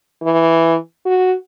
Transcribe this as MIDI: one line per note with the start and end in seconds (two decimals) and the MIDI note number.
0.23 0.76 52
1.05 1.34 66